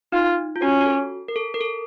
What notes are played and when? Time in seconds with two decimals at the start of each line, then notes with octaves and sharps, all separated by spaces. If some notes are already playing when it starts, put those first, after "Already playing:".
0.12 D#4 F4
0.56 F4
0.62 C#4 F#4
0.81 F#4
0.86 A4
1.28 A#4
1.36 A4
1.54 A#4
1.61 A4